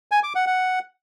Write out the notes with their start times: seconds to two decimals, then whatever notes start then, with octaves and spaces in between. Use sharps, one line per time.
0.11 G#5
0.23 D6
0.35 F#5
0.47 F#5